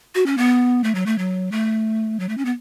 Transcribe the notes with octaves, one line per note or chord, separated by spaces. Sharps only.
F#4
C#4
B3
A3
F#3
A3
F#3
A3
F#3
A3
C#4
B3